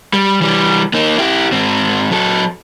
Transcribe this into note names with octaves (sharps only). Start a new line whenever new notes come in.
G3
E3 G3
A#3 D#4
E4 G4
G#2 C4
F#3 A4